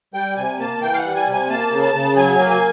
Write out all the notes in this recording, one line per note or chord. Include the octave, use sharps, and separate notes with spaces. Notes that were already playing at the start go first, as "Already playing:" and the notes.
G3 G5
C3 G#5
A#3 A5
E3 G5
F5
F#5
G3
G#5
C3
G#5
A#3 A5
C#3
A5
C#3
F#3 G#5
A#3
G#5